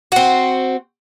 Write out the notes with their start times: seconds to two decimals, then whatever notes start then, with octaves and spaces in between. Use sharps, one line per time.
0.12 C4 F#4